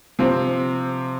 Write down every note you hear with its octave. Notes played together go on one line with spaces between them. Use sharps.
C3 F3 C4